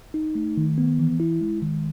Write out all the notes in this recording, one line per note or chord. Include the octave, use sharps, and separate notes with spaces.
D#4
A3
D#3
B3
E3
E4
G#3
D#3